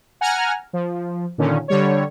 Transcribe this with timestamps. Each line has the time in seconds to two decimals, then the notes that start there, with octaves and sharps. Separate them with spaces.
0.21 F#5 G#5 A#5 F6
0.73 F3
1.38 A#2 D3 D#3 C#4
1.68 D3 G3 C#5